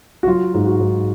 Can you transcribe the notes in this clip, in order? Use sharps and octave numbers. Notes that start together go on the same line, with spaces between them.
F#4
F#3 F4
G#2
F#4
G#2